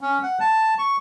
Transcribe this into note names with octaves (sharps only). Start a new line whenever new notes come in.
C#4
F#5
A5
C#6